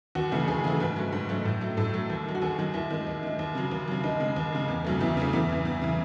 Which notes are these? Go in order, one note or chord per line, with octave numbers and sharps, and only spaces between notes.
D#2 F#4
C#3 E3 A3
D#2 G#4
C#3 E3 A3 G#4
G#2 B4
F#3 A3
G#2
F#3 A3
A2
F#3 A3
A2 A4
F#3 A3
D#2
D#3 F#3
F#4
D#2 G#4
D#3 F#3
D#2 E4
D#3 G#3
D#2
D#3 G#3
D#2
C#3 F#3
D#2
C#3 F#3
D#2 D#4
C#3 G#3
D#2
C#3 G#3
E2
C#3 F#3 A3
E2 E4
C#3 F#3 A3
E2 E4
C#3 E3
E2
C#3 E3